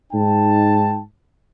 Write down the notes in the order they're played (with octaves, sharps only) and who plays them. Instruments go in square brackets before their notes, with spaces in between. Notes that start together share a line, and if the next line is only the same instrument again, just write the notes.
[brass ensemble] G#2 D#4 G5 A5